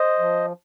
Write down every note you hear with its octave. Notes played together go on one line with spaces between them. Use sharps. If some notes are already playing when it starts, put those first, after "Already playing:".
Already playing: C5 D#5
F3